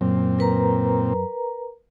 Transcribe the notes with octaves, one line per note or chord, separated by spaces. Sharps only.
F#2 A#2 C4
A#4 B4 A#5